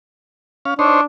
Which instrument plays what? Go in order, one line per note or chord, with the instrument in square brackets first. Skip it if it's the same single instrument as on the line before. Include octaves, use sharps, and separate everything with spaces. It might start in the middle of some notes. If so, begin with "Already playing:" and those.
[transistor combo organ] C#4 F5
[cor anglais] D4 [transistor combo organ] D#4 C5 C#5